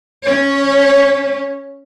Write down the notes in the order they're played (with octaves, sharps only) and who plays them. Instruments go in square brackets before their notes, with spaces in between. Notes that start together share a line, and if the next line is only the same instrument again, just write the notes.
[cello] C#4 C#5